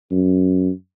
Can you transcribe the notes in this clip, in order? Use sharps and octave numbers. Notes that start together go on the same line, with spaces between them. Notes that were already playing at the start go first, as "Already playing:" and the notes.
F#2